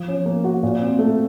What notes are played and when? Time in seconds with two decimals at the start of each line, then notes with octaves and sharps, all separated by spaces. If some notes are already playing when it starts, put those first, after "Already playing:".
Already playing: F3
0.08 C#4
0.26 A#3
0.44 F#4
0.63 A#2
0.82 C4
0.99 A3